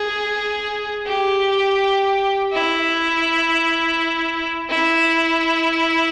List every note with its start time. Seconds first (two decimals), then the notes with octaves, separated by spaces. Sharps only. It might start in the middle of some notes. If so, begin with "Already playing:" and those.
Already playing: G#4
1.06 G4
2.53 E4
4.70 E4